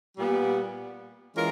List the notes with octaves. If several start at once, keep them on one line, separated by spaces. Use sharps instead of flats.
A#2 G3 B3
E3 G#3 C#4 F4 A#4